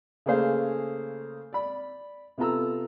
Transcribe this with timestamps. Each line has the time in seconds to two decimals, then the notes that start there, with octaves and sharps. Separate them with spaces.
0.26 C#3 A3 A#3 G#4 C5 F5
1.53 D5 B5
2.38 C3 B3 F4 A4 A#5 E6